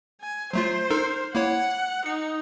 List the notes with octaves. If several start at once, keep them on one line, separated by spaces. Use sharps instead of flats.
G#5
F#3 A3 F4 C5
D#4 A4 A#4
A#3 E4 C#5 F#5
D#4 C#7